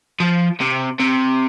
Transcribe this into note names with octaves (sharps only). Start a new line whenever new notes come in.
F3
C3
C3